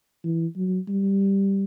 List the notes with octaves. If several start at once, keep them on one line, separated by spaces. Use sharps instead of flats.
E3
F#3
G3